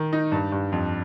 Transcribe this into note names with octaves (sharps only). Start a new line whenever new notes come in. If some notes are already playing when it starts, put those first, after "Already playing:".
Already playing: D#3
D#4
G2
G2
F2